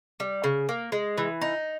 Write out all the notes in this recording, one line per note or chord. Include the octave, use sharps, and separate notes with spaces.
G3
C#3
A#3
G#3
E3
D#4